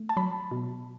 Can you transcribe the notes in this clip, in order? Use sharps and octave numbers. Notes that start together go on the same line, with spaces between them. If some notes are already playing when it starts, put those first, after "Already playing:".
Already playing: A3
A5
F#3 B5
B2